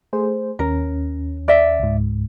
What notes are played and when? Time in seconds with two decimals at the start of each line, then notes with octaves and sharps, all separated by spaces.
0.13 A3 G#4 C5
0.59 D#2 C#4 A#4
1.48 D5 E5
1.79 C#2 G#2